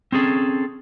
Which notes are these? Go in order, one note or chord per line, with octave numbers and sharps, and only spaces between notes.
C4 C#4 G#4 A4